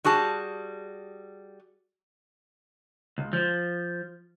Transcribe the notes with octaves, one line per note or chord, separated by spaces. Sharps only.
G3 F#4 G#4 A5
C#2
F3